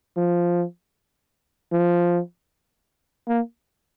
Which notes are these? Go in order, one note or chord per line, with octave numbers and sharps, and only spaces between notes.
F3
F3
A#3